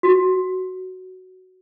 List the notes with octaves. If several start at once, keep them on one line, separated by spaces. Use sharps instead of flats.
F#4